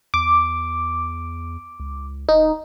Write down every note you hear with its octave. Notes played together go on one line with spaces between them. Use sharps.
E2 D6
C#2
D#1 D#4